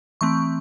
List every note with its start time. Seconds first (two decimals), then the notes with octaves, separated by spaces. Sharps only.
0.21 E3 A3 C4 C#6